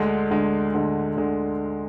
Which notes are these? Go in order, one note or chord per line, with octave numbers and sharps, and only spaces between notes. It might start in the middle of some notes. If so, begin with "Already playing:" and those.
Already playing: D2 D3 G#3
D2 D3 G#3
D2 D3 G#3
D2 D3 G#3